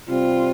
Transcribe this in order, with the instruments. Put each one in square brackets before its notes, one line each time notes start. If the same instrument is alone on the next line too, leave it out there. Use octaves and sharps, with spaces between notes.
[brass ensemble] C3 G3 C4 [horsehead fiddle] F4